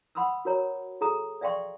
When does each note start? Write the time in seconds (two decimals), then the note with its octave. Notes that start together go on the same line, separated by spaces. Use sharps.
0.15 F#5 B5 C6 D#6 E6
0.45 F#4 A#4 C#5 A#5
1.01 G#4 A4 A#5 D#6
1.41 D5 E5 F5 G5 C6 C#6